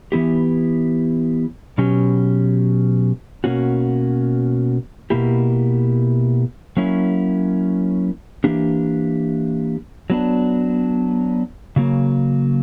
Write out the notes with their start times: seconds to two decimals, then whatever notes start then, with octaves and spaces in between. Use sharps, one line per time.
0.12 E3 B3 E4 G4
1.78 B2 F#3 C#4 G4
3.44 B2 A#3 C#4 F#4
5.10 B2 A#3 E4 G4
6.77 F#3 A#3 C#4 E4
8.44 E3 A#3 D4 G4
10.10 F#3 B3 D4
11.76 C#3 F#3 A#3